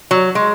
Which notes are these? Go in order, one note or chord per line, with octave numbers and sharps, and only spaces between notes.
F#3
G#3